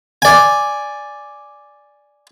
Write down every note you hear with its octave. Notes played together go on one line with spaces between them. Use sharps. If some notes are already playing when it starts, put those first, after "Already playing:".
D5 G#5